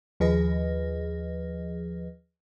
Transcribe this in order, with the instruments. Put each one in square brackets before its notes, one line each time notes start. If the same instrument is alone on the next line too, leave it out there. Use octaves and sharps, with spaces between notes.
[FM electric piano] D#2 F3 G#4 B4 D#5 A#6